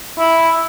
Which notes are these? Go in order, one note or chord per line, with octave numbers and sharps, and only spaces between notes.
E4